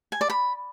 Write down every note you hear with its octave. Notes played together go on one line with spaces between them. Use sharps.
G#5
D5
B5